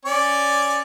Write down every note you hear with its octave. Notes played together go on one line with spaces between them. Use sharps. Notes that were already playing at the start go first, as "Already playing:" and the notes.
C#4 D5 D6